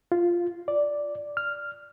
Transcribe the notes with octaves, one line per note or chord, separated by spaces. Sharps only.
F4
D5
F6